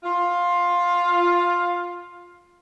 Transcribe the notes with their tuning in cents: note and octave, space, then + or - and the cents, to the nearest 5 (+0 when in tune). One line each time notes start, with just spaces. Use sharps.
F4 +10